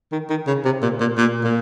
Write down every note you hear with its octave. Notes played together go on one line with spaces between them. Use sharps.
D#3
D#3
C#3
C3
A#2
A#2
A#2
A#2